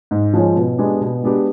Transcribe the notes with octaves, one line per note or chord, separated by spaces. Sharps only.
G#2
F3 G#3 C#4
B2
G#3 B3 D4 G4
B2
G#3 B3 D4 G4